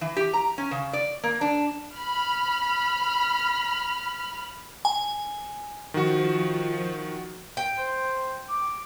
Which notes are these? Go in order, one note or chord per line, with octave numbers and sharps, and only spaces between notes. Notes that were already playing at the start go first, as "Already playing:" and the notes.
E3
G4
A#5
C#4
C#3
D5
A#3
D4
B5 F6
G#5
D#3 F3 F#4
G5
C5
D6